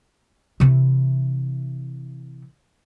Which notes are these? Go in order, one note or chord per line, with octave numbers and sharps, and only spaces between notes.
C3 E3